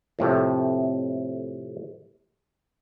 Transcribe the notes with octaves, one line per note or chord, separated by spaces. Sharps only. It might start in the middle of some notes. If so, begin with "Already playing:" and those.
F2 A2 C3 A3